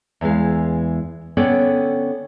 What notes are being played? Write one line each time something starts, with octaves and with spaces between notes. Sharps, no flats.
E2 E3 G#3 F5
D3 B3 C#4 A4 D5 G5